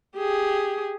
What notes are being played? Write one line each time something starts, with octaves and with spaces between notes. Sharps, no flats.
G4 G#4